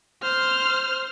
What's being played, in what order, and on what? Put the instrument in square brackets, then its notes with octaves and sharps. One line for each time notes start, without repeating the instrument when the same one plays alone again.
[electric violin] C5 F6